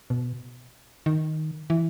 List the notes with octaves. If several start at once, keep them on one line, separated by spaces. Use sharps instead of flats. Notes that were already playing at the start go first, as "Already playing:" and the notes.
B2
D#3
E3